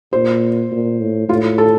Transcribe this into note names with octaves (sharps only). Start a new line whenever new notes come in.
A#2 C5
A#2
A2
A2 F4
A4